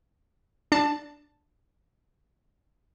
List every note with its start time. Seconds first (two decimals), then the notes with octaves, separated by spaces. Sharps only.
0.72 D4 A5 A6